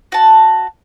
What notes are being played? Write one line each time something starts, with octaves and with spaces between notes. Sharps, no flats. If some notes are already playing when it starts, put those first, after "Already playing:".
F#4 A5